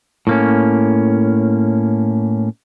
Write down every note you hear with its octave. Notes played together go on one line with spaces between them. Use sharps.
A2 A#3 C#4